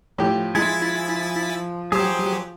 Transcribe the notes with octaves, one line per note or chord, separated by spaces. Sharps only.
A2 F3 G4
G#3 E4 G#5 A6 B6
F#3 G4 G#4 C5